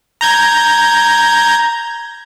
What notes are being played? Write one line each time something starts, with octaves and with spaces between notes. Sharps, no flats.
A#5 G6 G#6